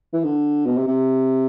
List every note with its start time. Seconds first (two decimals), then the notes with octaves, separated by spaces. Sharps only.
0.13 E3
0.24 D3
0.66 B2
0.77 C3
0.87 C3